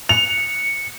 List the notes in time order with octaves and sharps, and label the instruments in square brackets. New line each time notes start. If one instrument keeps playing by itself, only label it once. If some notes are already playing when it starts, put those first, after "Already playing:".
[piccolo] C#7 [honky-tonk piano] F7